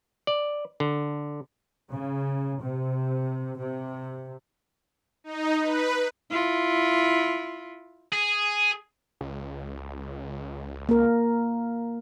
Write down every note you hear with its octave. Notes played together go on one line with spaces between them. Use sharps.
D5
D3
C#3
C3
C3
D#4
B4
E4 F4
G#4
C#2
A#3 A#4